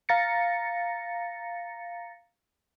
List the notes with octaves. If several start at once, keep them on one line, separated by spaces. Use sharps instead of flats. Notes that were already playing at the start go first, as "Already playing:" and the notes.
F5 A#5 A6 A#6 C#7